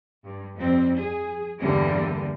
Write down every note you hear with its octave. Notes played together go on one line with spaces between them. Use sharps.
G2
F2 F3 G3 C4
G#4
E2 G2 D3 E3 G3 A#3